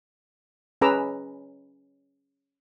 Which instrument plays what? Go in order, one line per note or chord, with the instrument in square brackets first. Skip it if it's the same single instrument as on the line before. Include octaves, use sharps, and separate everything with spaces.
[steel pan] C#4 G#4 B4 A#5 D6 E6